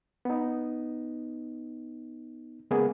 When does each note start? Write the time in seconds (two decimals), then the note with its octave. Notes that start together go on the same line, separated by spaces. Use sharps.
0.25 B3 D#4
2.71 C#3 G#3 A#3 B3 G#4